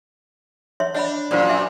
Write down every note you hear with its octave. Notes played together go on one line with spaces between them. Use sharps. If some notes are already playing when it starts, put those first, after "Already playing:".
C#5 E5 C6
D4 C#5 D#5 B5
F#2 A#2 F4 C5 D5
E5 G#5